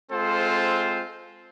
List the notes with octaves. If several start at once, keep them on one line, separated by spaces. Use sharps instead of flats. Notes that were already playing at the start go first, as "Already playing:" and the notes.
G#3 C4 F4 A4 C5